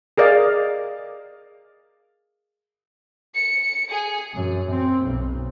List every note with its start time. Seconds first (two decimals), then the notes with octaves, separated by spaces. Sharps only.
0.18 G#4 A#4 D5 D#5 F5
3.35 C#7
3.90 G#4
4.34 F#2
4.69 C4
5.05 B1